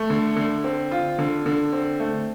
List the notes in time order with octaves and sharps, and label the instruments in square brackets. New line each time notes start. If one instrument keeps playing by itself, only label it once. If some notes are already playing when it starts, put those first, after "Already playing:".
Already playing: [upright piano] A3
D3
D3
C4
F4
D3
D3
C4
A3